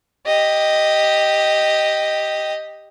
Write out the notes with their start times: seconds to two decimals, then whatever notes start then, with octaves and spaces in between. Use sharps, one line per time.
0.26 G4 D#5